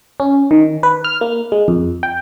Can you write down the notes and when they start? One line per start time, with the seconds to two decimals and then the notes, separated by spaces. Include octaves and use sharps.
0.20 C#4
0.51 D#3
0.83 B4
1.04 F6
1.21 A#3
1.52 G#3
1.68 F2
2.03 G5